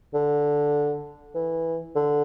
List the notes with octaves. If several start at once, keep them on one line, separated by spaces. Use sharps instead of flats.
D3
E3
D3